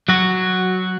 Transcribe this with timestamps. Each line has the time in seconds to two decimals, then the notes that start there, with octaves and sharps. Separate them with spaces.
0.08 F#3 F#4